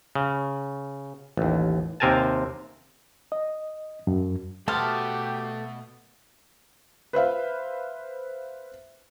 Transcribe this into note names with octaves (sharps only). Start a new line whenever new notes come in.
C#3
A1 D#2
D#2 C3 C4 A#4 G#5 A5
D#5
F#2
B2 A3 B3 F#4 G4 C5 A5 F6
B4 C5 E5 F5